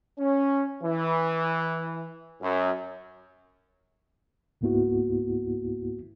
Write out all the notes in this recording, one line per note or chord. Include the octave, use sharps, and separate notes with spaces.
C#4
E3
F#2
C#2 G#2 A#3 B3 E4 F#4